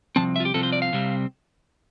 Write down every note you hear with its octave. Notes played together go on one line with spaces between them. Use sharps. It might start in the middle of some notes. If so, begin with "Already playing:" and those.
C2 C3 F3 C4 A5
E5
F4
G4
C2 C3 F3 C4 A4
C5
D5
F5
C2 C3 G3 C4